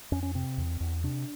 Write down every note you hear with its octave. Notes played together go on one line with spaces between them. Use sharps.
F2 C#4
C#4
C3 C4
E2
E2
C3 D4